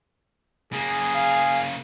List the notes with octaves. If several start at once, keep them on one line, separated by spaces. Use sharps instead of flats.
C#3 A#3 G#4
F5 G#5